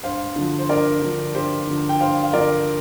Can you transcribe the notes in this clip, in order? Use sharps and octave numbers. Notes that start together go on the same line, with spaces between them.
G2 C5 F5
D3 F3
C5
G2 A#4 D5
D3 F3
G2 G4 C5
D3 F3
G5
G2 C5 F5
F5
D3 F3 A#4 D5